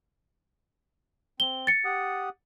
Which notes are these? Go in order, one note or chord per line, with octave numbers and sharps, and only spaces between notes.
C4 G7
A6 C#7
G4 F#5 D#6